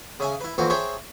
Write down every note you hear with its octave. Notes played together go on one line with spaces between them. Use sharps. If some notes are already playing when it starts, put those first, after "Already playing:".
C#3 E5 G#5
E4 B4
F2 A#2 E3 C4 F#4
G#4 C5 C#5 E5 G5 A5